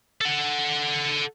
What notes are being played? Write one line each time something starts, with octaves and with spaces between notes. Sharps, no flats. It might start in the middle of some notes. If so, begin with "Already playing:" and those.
A4 F#5